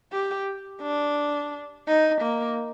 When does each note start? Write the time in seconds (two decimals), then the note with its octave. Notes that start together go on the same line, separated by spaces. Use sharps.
0.12 G4
0.82 D4
1.87 D#4
2.22 A#3